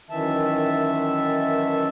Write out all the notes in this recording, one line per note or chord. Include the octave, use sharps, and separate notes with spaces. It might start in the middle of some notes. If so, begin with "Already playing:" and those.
F#2 D#3 E3 E5 A5